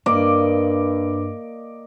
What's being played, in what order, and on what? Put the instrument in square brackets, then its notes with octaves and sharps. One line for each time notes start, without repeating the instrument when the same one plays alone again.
[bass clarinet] G2 [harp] A#3 [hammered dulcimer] D5 D#5 D6